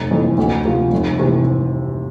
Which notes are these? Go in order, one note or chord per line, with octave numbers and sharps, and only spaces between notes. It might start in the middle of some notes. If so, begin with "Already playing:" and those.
Already playing: F1
F2 E3
D2
C3 F3
F1
C3 E3